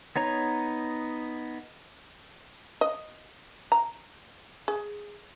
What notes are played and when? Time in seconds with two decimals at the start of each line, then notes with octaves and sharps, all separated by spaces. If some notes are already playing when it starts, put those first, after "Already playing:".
0.16 B3 D#4 C#5 A#5
2.81 D#5
3.72 A#5
4.68 G#4